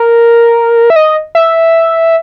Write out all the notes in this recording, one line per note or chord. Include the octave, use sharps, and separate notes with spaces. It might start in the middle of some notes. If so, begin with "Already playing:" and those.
Already playing: A#4
E5
D#5
E5